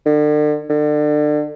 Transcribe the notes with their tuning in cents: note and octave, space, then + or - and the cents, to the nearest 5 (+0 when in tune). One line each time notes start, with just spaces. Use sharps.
D3 +40
D3 +30